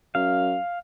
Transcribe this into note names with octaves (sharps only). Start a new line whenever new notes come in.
F#2 F5